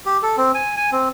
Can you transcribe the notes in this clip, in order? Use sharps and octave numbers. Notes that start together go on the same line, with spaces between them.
G4
A4
C4
G#5
G#5
C4